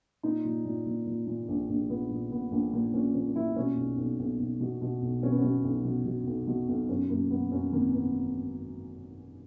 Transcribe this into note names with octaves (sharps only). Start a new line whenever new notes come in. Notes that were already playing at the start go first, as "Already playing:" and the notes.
A#2 D#4
A#2
A#2
A#2
A#2
A#2
A#1
A#1
A#2 B3
A#2
A#2 B3
A#1 A#3
A#2 A#3
A#2 C#4
A#2 C#4
A#2 E4
B2 C#4
B1
B1
B1
B1
B2
B2
B1
B2 C#4
B3
B2 C#4
B1
B2
B2
B1
B2
B1
F#2 C#4
F#2 A#3
F#2 B3
F#2 C#4
G#1 A#3
B3